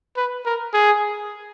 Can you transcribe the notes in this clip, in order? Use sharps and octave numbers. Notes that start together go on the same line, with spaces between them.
B4
A#4
G#4